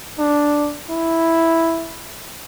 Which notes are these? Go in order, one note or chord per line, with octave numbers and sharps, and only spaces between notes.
D4
E4